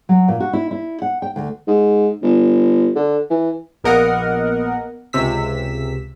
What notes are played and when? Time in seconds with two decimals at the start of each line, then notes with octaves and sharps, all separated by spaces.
0.09 F#3
0.28 A#2
0.40 F#4
0.53 E4
0.71 E4
1.02 F#5
1.22 G5
1.36 D2
1.68 G#2
2.23 G1
2.96 D3
3.30 E3
3.84 A#1 A#3 B3 A#4 D#5 F#5
5.13 C#2 C3 E6 B6